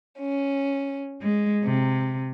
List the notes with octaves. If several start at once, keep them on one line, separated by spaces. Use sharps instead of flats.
C#4
G#3
C3